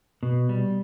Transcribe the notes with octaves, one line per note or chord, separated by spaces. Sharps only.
B2
G3